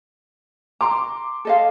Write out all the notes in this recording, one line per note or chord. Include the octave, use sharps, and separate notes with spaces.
A#5 C6 D6
A4 D#5 F5